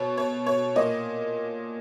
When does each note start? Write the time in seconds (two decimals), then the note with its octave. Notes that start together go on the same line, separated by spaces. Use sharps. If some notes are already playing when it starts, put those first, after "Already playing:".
Already playing: B2 C#5
0.17 C#5
0.46 C#5
0.76 A#2 D#5